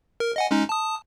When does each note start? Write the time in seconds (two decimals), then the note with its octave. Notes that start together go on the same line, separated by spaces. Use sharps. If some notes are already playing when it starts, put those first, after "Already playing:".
0.20 A#4
0.36 D#5 F#5 G#5
0.51 G#3 C#4 D#4
0.69 A5 D#6